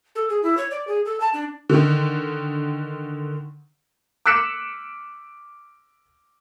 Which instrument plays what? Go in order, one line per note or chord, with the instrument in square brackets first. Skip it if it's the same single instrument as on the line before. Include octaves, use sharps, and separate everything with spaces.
[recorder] A4
G#4
E4
C#5
D5
G#4
A4
A5
D4
[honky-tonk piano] D3 D#3
[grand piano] D6 E6 F#6 B6 C#7 E7